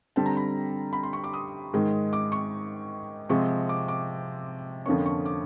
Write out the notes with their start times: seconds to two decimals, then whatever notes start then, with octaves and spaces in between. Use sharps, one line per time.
0.16 D3 G3 C4 A5
0.26 A#5
0.37 B5
0.93 B5
1.03 C6
1.13 C#6
1.24 D6
1.33 D#6
1.74 G#2 D#3 G#3
2.13 D6
2.32 C#6
3.29 C3 F3 G#3 C4 C#6
3.69 D6
3.88 D6
4.86 F2 D3 F3 A#3 C#4 C#6
5.06 C#6
5.26 D6